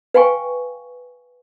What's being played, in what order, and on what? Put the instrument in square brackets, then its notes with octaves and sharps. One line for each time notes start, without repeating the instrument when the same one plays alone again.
[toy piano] B4 F5 G5 G#5 C#6